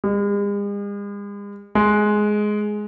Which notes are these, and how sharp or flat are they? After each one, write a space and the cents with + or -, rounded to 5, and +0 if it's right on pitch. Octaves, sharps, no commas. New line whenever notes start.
G#3 -45
G#3 +10